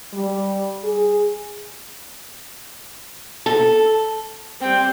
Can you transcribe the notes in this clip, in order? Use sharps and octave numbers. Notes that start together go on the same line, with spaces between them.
G3
G#4
A4
G3 C4 G5